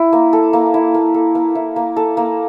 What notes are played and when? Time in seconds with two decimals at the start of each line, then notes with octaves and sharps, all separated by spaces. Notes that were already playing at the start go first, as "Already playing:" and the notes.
Already playing: E4
0.13 A#3
0.33 A4
0.53 A#3
0.74 E4
0.94 A#3
1.14 A4
1.35 A#3
1.55 E4
1.76 A#3
1.96 A4
2.17 A#3